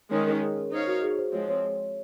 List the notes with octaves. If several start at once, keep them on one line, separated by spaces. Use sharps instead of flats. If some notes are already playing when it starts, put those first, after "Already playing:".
D#3 G#3 C#4 C#5
A#4
G#4
A#4
D#4 A#4 C5 C#5 F5
F#4
G#4
C5
F3 G#3 C4 C#5
C#5